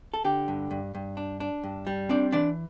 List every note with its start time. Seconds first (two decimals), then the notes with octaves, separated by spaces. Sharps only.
0.14 A4
0.24 D3 G4
0.48 G2
0.71 G2
0.95 G2
1.17 D4
1.40 D4
1.63 G2
1.87 G3
2.09 C4 D4 D5
2.32 E3 D4 D5